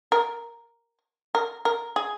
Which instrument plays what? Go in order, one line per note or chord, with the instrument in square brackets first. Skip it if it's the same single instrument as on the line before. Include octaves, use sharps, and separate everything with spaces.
[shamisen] A#4
A#4
A#4
G#4